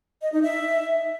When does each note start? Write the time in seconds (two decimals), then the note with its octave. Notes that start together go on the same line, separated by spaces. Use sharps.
0.22 D#5
0.32 D#4
0.42 E5